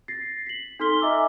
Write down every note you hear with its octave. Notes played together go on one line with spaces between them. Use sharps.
A6 A#6 C7
B6 F#7
D#4 A4 C6 F6 B6 G7
D#5 E5 G#5 A#5 D6 E6